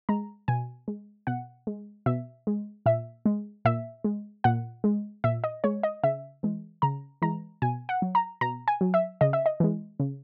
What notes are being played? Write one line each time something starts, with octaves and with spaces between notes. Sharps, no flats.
G#3 A#5
B2 G#5
G#3
B2 F#5
G#3
B2 E5
G#3
A#2 E5
G#3
A#2 E5
G#3
A#2 F#5
G#3
A#2 E5
D#5
G#3 C#5
D#5
C#3 E5
E3 G#3
C#3 A#5
E3 G#3 A#5
B2 G#5
F#5
F#3
A#5
B2 A#5
G#5
F#3
E5
C#3 D#5
E5
D#5
E3 G#3
C#3